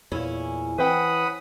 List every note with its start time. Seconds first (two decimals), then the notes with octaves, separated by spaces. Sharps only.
0.12 E2 A#2 C#4 E4
0.78 E3 C4 B4 F#5 G5 B5 D#6